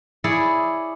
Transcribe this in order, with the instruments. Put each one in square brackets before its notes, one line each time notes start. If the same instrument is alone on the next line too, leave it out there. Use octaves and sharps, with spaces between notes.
[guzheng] E4 G#4 C#5 D5